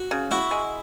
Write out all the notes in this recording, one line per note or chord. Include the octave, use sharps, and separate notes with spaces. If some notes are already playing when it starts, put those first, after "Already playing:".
Already playing: F#4
C#3
E4 F#4
G#3